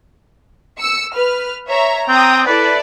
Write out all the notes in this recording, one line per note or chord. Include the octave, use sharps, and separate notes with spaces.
E6 C#7
B4 F6
C#5 E5 A#5
C4 G5 A#5 D#6
E4 A4 B4 D5